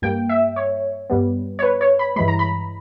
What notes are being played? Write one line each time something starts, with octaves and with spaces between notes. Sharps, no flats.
G2 G3 A#3 G5
E5
C#5
G2 G3 B3
C#5
B4
C#5
B5
G2 E3 G#3 B5
A#5
B5